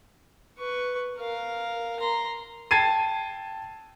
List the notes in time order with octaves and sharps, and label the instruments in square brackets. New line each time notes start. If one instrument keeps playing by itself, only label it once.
[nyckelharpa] B4 C#6
A#4 F5
A#5 C6
[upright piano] G5 A5 G#6 A6 C7 D#7